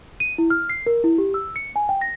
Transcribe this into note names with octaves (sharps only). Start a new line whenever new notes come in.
D#7
E4
F6
C7
A#4
E4
G4
E6
C#7
G#5
G5
A#6